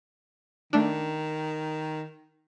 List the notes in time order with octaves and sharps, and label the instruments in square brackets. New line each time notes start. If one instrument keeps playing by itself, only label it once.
[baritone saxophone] D#3 [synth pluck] A3 D4